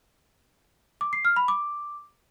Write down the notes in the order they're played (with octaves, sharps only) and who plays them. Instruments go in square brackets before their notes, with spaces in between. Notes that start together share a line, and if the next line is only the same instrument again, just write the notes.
[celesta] D6
C7
F6
B5
D6